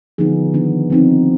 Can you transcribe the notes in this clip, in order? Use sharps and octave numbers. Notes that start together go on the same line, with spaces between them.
D3 F3 B3 D#4 G#4
D#3 B3 D4
F3 C4 D#4